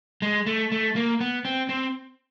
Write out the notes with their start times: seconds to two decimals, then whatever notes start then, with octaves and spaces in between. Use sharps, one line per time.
0.22 G#3
0.46 A3
0.72 A3
0.96 A#3
1.21 B3
1.45 C4
1.69 C4